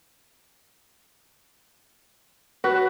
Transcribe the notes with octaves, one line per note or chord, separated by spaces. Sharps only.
F#4 B4